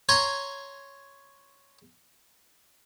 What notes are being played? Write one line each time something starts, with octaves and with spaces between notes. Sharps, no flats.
C#5 G#5 A#5 C6 C#6